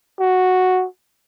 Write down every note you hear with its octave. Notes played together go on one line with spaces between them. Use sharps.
F#4